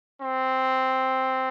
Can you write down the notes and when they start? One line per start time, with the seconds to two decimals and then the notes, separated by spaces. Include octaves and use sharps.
0.21 C4